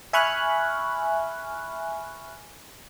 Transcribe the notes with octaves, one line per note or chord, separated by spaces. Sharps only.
E5 G#5 B5 C#6 F6 F#6